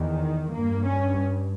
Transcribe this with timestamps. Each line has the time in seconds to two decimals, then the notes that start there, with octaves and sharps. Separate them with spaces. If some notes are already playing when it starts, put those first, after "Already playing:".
Already playing: E2 D#3
0.52 G2 A#3
0.84 C#4